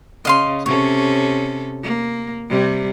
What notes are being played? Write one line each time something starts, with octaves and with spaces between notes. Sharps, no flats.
C#3 D#5 F5 C6
C3 C#4 A4 C#5
A#3
C3 G3